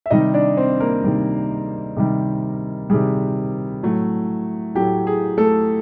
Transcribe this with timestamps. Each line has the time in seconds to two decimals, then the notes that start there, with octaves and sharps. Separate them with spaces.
0.06 E5
0.11 C3 D#3 G3 D#4 D#5
0.34 D4 D5
0.57 C4 C5
0.80 A#3 A#4
1.04 C3 D#3 G3
1.97 C3 D#3 G3
2.90 C3 D#3 G3 G#4
3.83 A2 F#3 A3
4.75 A2 F#3 A3 G4
5.07 G#4
5.37 A3 A4